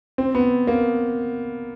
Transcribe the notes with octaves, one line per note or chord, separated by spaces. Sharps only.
C4
B3
A#3